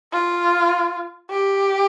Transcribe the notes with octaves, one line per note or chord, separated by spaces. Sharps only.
F4
G4